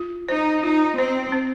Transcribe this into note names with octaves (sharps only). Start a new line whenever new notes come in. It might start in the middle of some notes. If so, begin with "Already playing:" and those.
Already playing: F4
D#4 C5
D#4 F4
C4 C5
C4